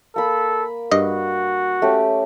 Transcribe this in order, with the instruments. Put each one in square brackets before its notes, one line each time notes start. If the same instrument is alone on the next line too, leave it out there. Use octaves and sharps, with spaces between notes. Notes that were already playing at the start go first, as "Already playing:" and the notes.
[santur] A#3 B5 [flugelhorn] A4
[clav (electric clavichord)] G2 D#5 [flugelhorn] F#4
[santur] A3 C#4 G4